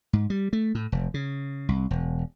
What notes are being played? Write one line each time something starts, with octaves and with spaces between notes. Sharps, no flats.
G#2
G3
A3
A2
F1
C#3
C2
E1